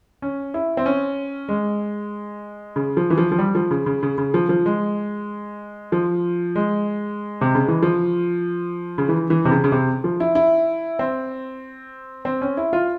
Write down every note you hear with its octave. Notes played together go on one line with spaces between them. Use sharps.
C#4
E4
C4
C#4
G#3
C#3
F3
E3
F3
F3
G3
F3
C#3
C#3
C#3
C#3
F3
F3
G#3
F3
G#3
C3
C#3
E3
F3
C#3
E3
E3
C3
C#3
C#3
C3
F3
E4
E4
C4
C4
C#4
E4
F4